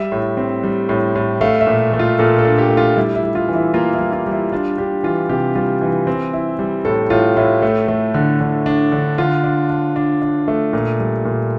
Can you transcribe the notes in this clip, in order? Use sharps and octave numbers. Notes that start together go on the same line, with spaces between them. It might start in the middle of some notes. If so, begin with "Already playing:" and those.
Already playing: G3 E5
A2
C4
G3
A2
A2
A3 F5
E5
A#2
A3
F4
A#2 A4
A4
D4
G4
A3
F4
G3 E4
E4
G3
F4
E3
E4
A#3 F4
E4
G3
F4
G3
E4
D4 F4
D4 G4
E3 F4
C3 G4
G3 F4
E3
C4
E4
G3
A2 A4
A2 F4
A2 E4
A3
A3
D3
D3
D4
D3
D3 F4
D4
D4
D4
D4
A3
A#2
G3
A#2